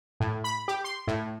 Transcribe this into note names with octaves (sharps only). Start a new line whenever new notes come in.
A2
B5
G4
C6
A2